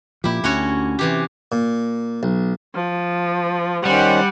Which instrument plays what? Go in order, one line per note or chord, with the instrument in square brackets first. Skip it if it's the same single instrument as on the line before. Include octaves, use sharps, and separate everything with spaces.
[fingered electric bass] A#2 F3 [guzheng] E4 G4
[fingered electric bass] D2 [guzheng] C#4 F#4 C#5
[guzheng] C3 E3 G4
[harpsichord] A#2
B1
[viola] F3
[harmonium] D#3 C#4 C5 [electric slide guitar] G3 [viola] F#5